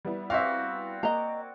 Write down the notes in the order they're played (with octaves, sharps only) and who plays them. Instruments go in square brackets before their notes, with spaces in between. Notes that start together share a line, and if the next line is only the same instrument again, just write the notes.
[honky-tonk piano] G3 B3 E4
[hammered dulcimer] C4 F#4 D5 [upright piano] E5 F5
[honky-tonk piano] A#3 [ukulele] D#5 A#5